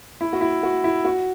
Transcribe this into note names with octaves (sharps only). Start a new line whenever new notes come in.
E4
F#4
E4
F#4
E4
F#4